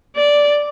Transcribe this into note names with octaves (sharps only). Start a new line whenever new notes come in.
D5